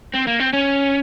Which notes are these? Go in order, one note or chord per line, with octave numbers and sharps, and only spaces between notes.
C4
A#3
C4
C#4